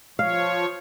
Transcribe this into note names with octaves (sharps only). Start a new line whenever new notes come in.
F3 C#5 F5